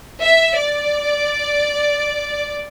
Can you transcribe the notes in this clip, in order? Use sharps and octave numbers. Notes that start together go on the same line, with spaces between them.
E5
D5